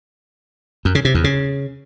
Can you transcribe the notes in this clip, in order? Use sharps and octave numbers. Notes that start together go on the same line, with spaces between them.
F#2
C#3
C3
E2
C#3